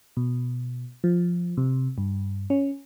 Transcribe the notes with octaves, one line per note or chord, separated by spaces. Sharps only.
B2
F3
C3
G2
C#4